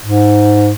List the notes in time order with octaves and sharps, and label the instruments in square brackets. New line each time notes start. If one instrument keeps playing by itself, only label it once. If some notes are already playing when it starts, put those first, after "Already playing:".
[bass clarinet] G#2